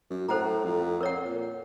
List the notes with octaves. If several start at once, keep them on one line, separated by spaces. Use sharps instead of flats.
F#2
A2 A4 C5 F#5 A#5
F2
A#4 C#5 F#5
A#2